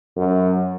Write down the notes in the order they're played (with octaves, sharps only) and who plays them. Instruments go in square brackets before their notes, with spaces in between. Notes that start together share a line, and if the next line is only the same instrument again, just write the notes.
[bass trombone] F#2